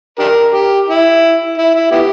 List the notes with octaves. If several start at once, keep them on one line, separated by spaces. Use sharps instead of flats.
D4 G4 A#4
G4
E4
E4
E4
B3 E4 G4